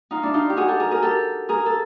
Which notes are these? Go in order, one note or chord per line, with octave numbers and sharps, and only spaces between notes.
D#4 F4
D4 E4
D#4 F4
G4
F#4 G#4
G4 A4
G#4 A#4
G#4 A#4
G4 A4
G#4 A#4
A4